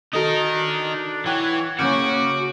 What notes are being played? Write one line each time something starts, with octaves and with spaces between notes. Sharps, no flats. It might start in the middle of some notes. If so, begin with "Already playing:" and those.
D#4 F#4 A4 A#4 A5 D#6
D4
E3 C#5 F#5 G5 F#6
C#3 A#3 C#4 F#4 D6 F6 G6